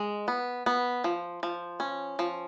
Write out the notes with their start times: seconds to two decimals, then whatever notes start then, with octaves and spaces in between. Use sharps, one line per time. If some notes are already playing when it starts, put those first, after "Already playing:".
Already playing: G#3
0.28 B3
0.66 B3
1.04 F3
1.43 F3
1.80 C#4
2.19 F3